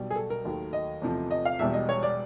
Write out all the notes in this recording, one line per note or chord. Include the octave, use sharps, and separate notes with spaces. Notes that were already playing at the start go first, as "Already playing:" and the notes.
Already playing: B1 B2 G3
G#4
A4
A#4
D#2 D#3 F#3 A3
D#5
E2 C3 F3 A3
D#5
F5
E1 E2 B2 G3 E5
D#5
C#5
D5